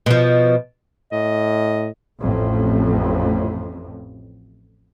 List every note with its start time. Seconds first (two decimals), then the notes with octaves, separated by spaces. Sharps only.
0.06 B2 F3
1.12 A2 D#5
2.19 A1 F2 A2